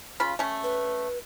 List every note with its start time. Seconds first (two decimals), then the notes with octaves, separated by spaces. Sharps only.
0.20 C#3 F4 B5
0.39 A3 C#4
0.63 B4